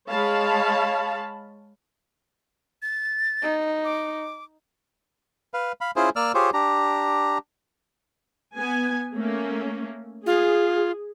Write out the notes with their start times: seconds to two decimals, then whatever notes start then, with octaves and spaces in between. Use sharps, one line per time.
0.10 G#3 C#5 F5 A5 B5
2.82 A6
3.43 D#4
3.84 D6
5.54 B4 F5
5.81 F5 B5
5.96 C#4 E4 F4 G#4 C5
6.16 A#3 D5 E6 F6
6.34 F4 G4 G#4 C5 C#5
6.53 D4 G4 A#5
8.56 B3 G#5
9.14 A3 A#3 C#4
10.26 F4 G#4